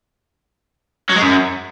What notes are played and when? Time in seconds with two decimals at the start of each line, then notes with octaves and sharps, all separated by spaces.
1.10 F#3
1.16 G#3
1.22 F#2